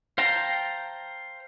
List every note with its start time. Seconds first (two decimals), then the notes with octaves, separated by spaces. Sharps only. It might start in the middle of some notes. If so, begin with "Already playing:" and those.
0.18 C5 F5 G5 A5 A#5